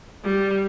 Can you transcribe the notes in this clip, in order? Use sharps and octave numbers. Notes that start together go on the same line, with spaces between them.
G3